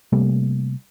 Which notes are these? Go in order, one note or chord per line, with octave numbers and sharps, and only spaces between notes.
C3 G3 A3 A#3